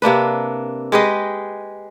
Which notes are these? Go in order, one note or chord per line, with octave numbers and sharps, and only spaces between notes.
C3 A#3 D4 B4
G#3 G4 B4 D#5